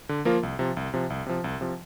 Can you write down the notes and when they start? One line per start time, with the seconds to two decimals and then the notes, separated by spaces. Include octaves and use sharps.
0.09 D3
0.25 F3 A#3 F4 A#4
0.43 C2
0.59 C3 F3
0.77 C2
0.94 C3 F3
1.10 C2
1.26 C3 F3
1.44 C2
1.61 C3 F3